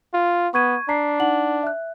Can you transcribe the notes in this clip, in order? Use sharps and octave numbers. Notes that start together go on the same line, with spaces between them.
F4
B3 C#6 G#6 D#7
D4 A#5 B6 C7
D#4 F#5 F#7
E5 F#6